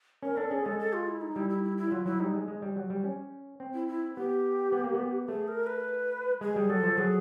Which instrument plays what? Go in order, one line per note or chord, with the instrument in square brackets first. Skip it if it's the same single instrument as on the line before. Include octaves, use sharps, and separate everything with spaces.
[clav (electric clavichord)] C#4 [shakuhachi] A#4
[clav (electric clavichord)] D4 [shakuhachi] A4
[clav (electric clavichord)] C#4 [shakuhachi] G#4
[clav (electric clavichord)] G#3 [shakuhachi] A4
[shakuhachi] A4
F4
E4
D#4
[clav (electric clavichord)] G3 [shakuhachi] E4
[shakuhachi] E4
E4
E4
[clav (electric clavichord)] F#3 [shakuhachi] F4
[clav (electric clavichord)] F#3 [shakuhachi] E4
[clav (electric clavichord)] G3 [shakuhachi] D#4
[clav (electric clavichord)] G#3
G#3
G3
F#3
G3
C#4
C4
[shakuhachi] E4
E4
[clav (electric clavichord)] B3 [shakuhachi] G4
[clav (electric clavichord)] B3
A#3
B3
[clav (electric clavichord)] A3 [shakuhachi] G#4
[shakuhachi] A#4
B4
[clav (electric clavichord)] G#3 [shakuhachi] G#4
[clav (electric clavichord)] G3
[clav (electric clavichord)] F#3 [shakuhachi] A4
[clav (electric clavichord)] F3
[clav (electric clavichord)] F#3 [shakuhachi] G#4